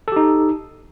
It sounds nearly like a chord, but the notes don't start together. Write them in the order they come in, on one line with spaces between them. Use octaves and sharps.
A4 G4 D#4